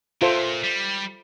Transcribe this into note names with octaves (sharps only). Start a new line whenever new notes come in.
A#2 F4 A4 C5 E5
G3